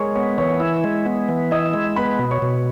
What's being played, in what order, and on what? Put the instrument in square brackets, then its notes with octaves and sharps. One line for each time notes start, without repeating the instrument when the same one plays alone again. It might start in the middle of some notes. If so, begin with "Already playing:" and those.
Already playing: [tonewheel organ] G#3 [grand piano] G#4 A#4 C#5 C#6
[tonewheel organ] B3 [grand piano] C#5 C#6
[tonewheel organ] E3 [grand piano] C#5 C#6
[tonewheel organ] E4
G#3
B3
E3
[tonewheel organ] E4 [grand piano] D#5 D#6
[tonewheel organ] G#3
[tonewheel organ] B3 [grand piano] B4 B5
[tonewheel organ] B2
[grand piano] C#5 C#6
[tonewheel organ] B2